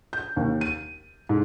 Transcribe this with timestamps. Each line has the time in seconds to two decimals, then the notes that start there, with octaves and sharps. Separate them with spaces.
0.13 G6
0.37 D#2
0.61 D#7
1.29 G#2